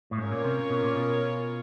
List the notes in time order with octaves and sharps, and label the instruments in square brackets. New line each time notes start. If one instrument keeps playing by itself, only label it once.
[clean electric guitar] A2
[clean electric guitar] G#2 [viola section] C#4 F4 A#4 C#5
[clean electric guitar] A#2
C3
B2
A#2
B2